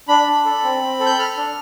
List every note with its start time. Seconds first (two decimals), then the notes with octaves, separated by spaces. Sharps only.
0.08 D4 B5
0.27 D4
0.45 A4
0.63 C4
0.82 C4
1.00 A4
1.06 G6
1.19 A4 F6
1.37 D4